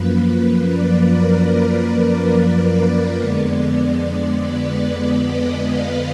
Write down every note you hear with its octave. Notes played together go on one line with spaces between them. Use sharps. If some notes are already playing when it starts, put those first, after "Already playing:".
Already playing: F#2 F3 A#3 B4
B4
D5
A#4
B4
F2 D3 G#3 B3 D5
B4
D5
D#5
F5